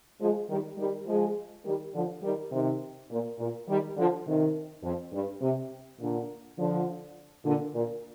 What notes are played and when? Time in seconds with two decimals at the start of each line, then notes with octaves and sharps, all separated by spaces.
0.20 F3 G#3
0.48 D#3 G3
0.78 D#3 G3
1.06 F3 G#3
1.65 D#3 G3
1.94 D3 F3
2.23 D#3 G3
2.52 C3 D#3
3.10 A#2
3.39 A#2
3.68 D#3 G3
3.97 D3 F3
4.26 C3 D#3
4.83 F2
5.13 G2
5.42 C3
6.00 A#2 D3
6.58 D3 F3
7.45 A#2 D3
7.73 A#2